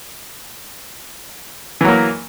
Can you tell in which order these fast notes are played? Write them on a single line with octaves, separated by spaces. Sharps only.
E3 F#3 A#3